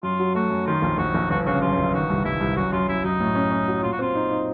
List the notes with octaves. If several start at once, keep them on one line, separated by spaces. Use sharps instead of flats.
F#2 F4
F#3
A3 F#4
F#2
D#3 F4
A#1
A#1 F#4
A#1
G1 F#4
C#3 F#4
F#2 F4
G1
D#3 F#4
C2
C2 E4
C2
F#2 F#4
F#2 F4
F#2 E4
F#2 D#4
A2
C#4
C#4
F#3
A#2 F4
F#4
C4 F4
D#4
D#4